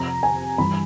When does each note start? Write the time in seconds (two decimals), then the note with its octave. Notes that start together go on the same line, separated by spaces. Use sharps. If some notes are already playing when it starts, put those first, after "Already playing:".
Already playing: F2 C3 F3 A#5
0.23 G#5
0.58 G2 E3 B5